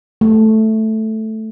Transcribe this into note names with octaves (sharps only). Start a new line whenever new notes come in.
A3